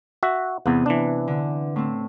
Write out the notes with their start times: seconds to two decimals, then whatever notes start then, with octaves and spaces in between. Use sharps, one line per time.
0.23 F#4 E5
0.66 E2 C3 B3 F#5
0.86 E3 D4
1.28 D3
1.76 A2 C4